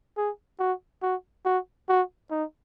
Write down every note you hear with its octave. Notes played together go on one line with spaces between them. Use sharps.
G#4
F#4
F#4
F#4
F#4
D#4